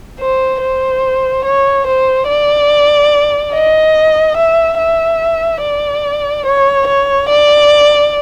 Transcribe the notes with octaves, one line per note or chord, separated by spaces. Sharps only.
C5
C5
C#5
C5
D5
D#5
E5
E5
D5
C#5
C#5
D5